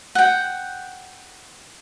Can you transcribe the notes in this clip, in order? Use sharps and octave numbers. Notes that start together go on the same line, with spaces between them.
F#5 G5